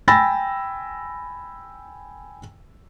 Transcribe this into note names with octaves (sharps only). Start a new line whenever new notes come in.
G5 G#5 B5 E6 A6 A#6